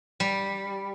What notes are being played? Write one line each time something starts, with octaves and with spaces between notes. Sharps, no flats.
G3